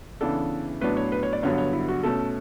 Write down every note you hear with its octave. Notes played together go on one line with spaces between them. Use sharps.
C#3 E3 B3 D4 A4
A2 F#3 B3 D4 B4
C#5
B4
C#5
D5
G2 D3 F#3 B3 C#5
C#5
E4
F#4
B2 A3 C#4 A4